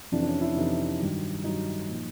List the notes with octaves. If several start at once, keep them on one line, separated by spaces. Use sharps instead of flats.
F2 C3 E3 D4
D4
C#4
E4
F2 C3 E3 D#4
G2 D#3 F#3
G2 D#3 F#3 D#4
A#2 F3